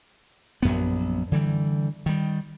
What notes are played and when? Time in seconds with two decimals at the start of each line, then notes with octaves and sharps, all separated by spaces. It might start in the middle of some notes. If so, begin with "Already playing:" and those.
0.62 A#1 F#2 B3
1.32 D3 E3 G3
2.06 D#3 G3